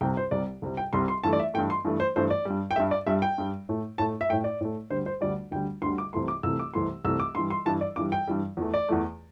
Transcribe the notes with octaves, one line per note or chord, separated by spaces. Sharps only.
C2 C3 G3 G5
C5
C2 C3 G3 D5
C2 C3 G3
G5
C2 C3 G3 C6
C6
G2 E3 A3 A5
D5
E5
G2 E3 A3 G5
C6
G2 E3 A3
C5
G2 E3 A3 C5
D5
G2 G3
G5
G2 G3 E5
D5
G2 G3 E5
G5
G2 G3
A2 A3
A2 A3 A5
E5
A2 A3 G5
D5
A2 A3
D2 D3 G3 C5
C5
D2 D3 G3 D5
D2 D3 G3 G5
D2 D3 G3 C6
D6
C2 C3 E3 A3 C6
D6
C2 C3 E3 A3 E6
D6
C2 C3 E3 A3 C6
C2 C3 E3 A3 E6
D6
G2 E3 G3 C6
C6
G2 E3 G3 A5
D5
G2 E3 G3 D6
G5
G2 E3 G3
E2 E3 A3
D5
E2 E3 A3